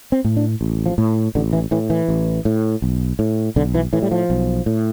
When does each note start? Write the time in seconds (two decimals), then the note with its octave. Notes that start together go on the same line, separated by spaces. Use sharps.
0.12 C4
0.25 A2
0.37 D4
0.61 A1
0.86 F3
0.98 A2
1.35 A1 D3
1.53 E3
1.71 A2 E3
1.90 E3
2.09 A1
2.45 A2
2.82 B1
3.19 A2
3.56 B1 D3
3.74 E3
3.93 A2 E3
4.02 G3
4.11 F3
4.30 B1
4.66 A2